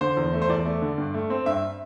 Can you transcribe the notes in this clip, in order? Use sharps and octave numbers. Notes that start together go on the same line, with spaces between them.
D3 C5
E2
A3
C5
E2 D5
A3
D3
G2
A3
C4
G2 E5